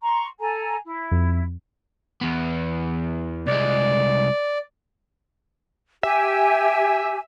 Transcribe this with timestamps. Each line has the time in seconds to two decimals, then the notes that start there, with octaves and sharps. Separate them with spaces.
0.02 A#5 C6 C#6
0.39 A4 G#5 A#5
0.86 E4
1.11 F2
2.21 E2 B3
3.47 C2 G#3 D5
6.03 G4 E5 G#5